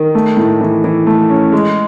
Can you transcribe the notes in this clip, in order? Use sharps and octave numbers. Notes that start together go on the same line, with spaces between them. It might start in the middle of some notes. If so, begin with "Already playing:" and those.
Already playing: D#3
A3
A2
E3
E3
A3
C#4
G#3